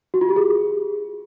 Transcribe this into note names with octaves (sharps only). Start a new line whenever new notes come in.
F#4
F4
G4
G#4